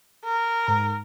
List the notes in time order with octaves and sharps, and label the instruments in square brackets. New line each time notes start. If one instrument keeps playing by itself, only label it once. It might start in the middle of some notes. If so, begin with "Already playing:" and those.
[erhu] A#4
[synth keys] G#2 A#5